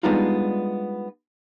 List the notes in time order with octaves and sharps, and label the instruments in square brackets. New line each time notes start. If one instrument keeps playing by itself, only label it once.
[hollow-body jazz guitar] G3 G#3 B3 D4 D#4 F4